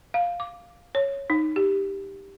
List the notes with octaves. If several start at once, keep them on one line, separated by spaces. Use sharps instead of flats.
F5
D6
C#5
D#4
G4